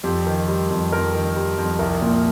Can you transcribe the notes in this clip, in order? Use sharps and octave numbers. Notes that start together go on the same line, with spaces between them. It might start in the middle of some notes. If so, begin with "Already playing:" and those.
F2 G4
D#3
G3
F2
F2 A#4
D#3
G3
F2
C2 A#4
A#2